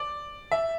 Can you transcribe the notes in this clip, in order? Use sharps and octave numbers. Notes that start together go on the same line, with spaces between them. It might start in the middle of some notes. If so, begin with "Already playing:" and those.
Already playing: D5
E5